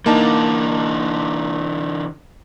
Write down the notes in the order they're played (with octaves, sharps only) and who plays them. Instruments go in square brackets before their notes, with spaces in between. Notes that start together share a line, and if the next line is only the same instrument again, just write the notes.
[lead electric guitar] D3 E3 [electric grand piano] A#3 D#4 A5